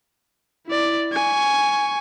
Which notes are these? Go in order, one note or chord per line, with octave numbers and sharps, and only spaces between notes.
E4 D5
G#5 C#6